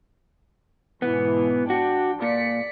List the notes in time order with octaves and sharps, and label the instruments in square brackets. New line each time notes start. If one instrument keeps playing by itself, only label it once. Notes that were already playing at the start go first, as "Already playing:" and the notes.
[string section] G#2 B2 E3 [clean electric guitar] B3
[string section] D4 G5 [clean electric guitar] F#4
[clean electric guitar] A#2 [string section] D5 B6 C#7